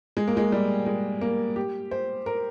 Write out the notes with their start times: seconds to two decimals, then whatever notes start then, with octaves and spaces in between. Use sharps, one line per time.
0.17 G#3
0.28 A#3
0.37 G#3
0.52 G3
0.86 G#3
1.21 A#3
1.56 G4
1.91 C5
2.26 A#4